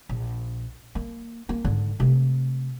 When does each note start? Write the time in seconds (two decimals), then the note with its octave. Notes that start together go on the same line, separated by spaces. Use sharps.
0.09 A#1
0.95 A#3
1.49 A#3
1.65 G#2 D3
2.00 C3 A3